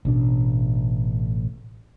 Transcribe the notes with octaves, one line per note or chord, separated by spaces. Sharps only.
A1 B2 D4